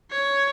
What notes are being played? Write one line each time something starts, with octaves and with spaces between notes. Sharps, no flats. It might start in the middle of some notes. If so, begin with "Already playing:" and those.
C#5